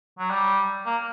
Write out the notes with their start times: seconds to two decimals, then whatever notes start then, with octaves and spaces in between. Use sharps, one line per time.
0.19 F#3
0.30 G3
0.86 A#3